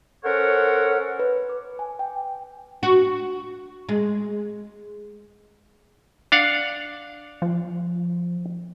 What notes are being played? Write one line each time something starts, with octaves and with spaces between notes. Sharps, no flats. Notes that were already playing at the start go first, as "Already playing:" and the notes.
C#4 A4 A#4 C5 C#5 F#5
B4
D6
G#5
G5
F#4
G#3
D4 F5 F#5
F3